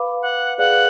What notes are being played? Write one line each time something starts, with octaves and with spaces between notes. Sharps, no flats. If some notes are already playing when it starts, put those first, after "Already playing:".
Already playing: B4 F5 B5 D6
F#5
G#4 B4 D5 F5 F#5